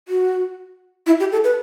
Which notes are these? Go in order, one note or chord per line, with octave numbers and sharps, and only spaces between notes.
F#4
E4
G4
A4
B4